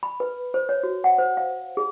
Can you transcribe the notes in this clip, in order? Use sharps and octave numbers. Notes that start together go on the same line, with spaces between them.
B5
B4
C5
C#5
F#4
F#5
C5
F5
G#4